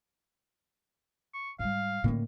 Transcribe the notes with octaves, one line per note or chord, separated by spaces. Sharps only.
C#6
G#2 G3 F5
A2 D3 A#3 C#4